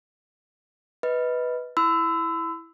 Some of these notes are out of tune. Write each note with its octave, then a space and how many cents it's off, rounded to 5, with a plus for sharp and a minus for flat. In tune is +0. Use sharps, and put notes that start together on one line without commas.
B4 +0 D#5 +25 B5 +0
E4 +0 B5 +45 E6 +0